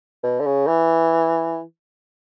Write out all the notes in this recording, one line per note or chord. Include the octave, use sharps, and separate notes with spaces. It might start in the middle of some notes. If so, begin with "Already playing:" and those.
B2
D3
C#3
E3